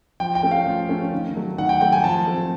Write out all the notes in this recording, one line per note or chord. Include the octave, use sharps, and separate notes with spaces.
F3 G5
G5
A3 C#4
F5
F3
A3 C#4
D#3
F#3 A3
D#3 F#5
G5
F#3 A3 G5
G#5
F3 A5
A3 C4